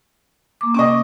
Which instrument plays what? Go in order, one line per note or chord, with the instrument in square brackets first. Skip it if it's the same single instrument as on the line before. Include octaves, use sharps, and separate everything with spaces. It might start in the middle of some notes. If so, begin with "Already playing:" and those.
[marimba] A#3 D6
[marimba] C3 C#4 [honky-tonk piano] D#5 C#6 D6